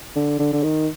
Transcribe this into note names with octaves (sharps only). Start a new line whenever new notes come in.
D3
D3
D3
D#3